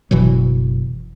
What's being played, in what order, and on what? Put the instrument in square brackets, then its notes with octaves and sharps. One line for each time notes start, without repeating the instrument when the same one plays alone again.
[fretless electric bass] F#1 B2 E3 F#3